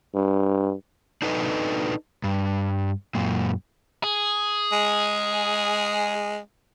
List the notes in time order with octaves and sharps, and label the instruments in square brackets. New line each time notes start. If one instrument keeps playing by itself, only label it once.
[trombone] G2
[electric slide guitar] D4 D#4 A4 B4 D#5
G2
F#2 A#2
[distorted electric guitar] G#4
[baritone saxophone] G#3